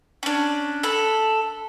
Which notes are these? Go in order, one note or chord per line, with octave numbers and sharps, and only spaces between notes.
C#4 D4
A4 B5